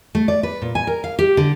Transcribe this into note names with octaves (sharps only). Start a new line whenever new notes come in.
A3
D5
B4
A#2
G#5
A#4
F5
G4
D3